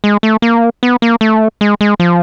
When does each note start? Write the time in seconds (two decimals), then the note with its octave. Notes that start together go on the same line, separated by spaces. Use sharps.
0.04 G#3
0.23 A3
0.42 A#3
0.83 B3
1.02 A#3
1.21 A3
1.61 G#3
1.81 G#3
2.00 F3